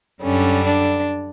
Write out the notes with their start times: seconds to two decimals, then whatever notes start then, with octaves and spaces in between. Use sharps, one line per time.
0.22 F#2 D3 G3 C#4
0.65 D4